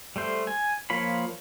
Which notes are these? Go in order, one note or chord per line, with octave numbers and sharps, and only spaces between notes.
G3 A3 C5
G#5
F3 A#3 F4 C#5 B5